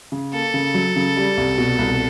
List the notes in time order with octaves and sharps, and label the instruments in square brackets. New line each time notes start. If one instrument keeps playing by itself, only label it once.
[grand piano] C#3
[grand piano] A#3 [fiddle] A4
[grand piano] C#3
F#3
C#3
G3
C2
B2
C2